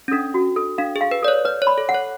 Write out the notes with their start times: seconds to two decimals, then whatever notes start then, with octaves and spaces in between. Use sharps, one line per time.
0.08 C#4
0.11 D4 A4
0.34 F#4
0.56 A4
0.78 D4 F5
0.96 G#4
1.01 F5
1.11 B4
1.22 A4 D5
1.28 C#5
1.45 B4 D5
1.62 C#5
1.67 B5
1.78 A4
1.89 F#5
1.94 C#5